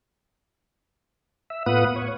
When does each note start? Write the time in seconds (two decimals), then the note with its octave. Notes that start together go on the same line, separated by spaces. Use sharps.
1.50 E5
1.66 A2 B3 F4 B4 F#5 D#6
1.96 C#5